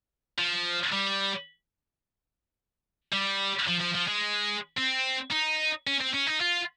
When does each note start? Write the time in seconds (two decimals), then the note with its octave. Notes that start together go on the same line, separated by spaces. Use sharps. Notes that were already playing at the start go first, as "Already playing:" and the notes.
0.38 F3
0.92 G3
3.12 G3
3.68 F3
3.80 F3
3.94 F3
4.08 G#3
4.77 C4
5.31 D#4
5.87 C#4
6.01 C4
6.14 C#4
6.27 D#4
6.41 F4